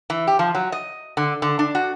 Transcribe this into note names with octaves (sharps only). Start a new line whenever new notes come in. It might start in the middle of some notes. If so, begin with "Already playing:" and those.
E3
G4
F3
F#3
D#5
D3
D3
D4
F#4